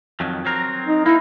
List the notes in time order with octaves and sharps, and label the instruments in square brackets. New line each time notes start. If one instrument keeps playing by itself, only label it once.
[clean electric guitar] F2 D#3 F#3
F#3 C4 A#4
[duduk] D#4
[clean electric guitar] A#3 D#4 [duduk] E4